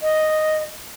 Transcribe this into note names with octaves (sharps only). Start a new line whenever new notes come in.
D#5